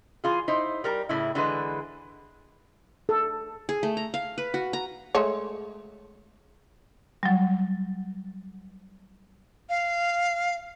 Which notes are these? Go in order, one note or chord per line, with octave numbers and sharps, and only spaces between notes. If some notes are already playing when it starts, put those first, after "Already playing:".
E3 F4 G#4
D#4 E4 C5
G3 A#4 A#5
A2 C#3 E4
D3 E3 G#3 B4
A4
G#4
A3
A#5
F5
B4
F#4
A#5
G#3 A3 C#5
F#3 G3
F5